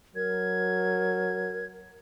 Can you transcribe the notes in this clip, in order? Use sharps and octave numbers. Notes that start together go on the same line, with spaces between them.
F#3 A#4 G#6